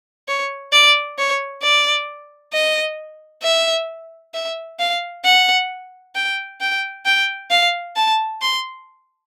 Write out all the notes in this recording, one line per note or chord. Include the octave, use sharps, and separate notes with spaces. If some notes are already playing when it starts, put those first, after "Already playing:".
C#5
D5
C#5
D5
D#5
E5
E5
F5
F#5
G5
G5
G5
F5
A5
C6